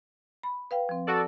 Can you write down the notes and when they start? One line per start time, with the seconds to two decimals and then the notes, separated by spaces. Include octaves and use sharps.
0.43 B5
0.71 B4 F5 G5
0.89 F3 C4
1.07 F#4 A4 D5